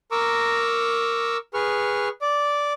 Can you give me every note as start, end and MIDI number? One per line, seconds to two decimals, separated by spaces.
0.12 1.37 70
0.12 1.37 82
0.12 1.37 85
0.12 1.37 86
0.12 1.37 88
1.54 2.09 68
1.54 2.09 71
1.54 2.09 85
1.54 2.09 89
2.22 2.73 74
2.22 2.73 86